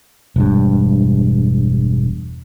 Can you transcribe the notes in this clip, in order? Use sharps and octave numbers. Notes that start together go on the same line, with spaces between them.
E1 G2